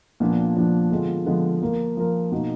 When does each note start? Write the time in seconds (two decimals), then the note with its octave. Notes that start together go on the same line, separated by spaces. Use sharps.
0.20 A#2 F3 B3 D4
0.56 A#2 F3 B3 D4
0.90 D3 F3 G#3 B3 F4
1.26 D3 F3 G#3 B3 F4
1.62 F3 A#3 F4 A#4
1.97 F3 A#3 F4 A#4
2.31 B2 A#3 D#4 F#4